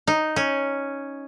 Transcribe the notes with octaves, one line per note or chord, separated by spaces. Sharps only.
D#4
C#4